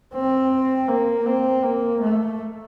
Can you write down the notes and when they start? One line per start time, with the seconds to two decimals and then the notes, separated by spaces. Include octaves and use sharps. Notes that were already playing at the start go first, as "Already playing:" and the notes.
0.14 C4
0.88 A#3
1.26 C4
1.63 A#3
2.00 A3